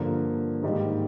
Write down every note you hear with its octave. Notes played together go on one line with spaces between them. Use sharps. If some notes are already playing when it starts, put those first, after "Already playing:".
Already playing: G2 D3 F3 A#3
G#2 D#3 G3 A#3